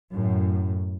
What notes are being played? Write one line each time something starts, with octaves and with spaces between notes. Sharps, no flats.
F#2 A2